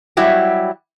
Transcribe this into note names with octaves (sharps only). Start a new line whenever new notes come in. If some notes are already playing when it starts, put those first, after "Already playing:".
F#3 G3 E4 F#4 G4